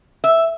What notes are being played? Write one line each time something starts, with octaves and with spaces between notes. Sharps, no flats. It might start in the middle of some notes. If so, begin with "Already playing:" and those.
E5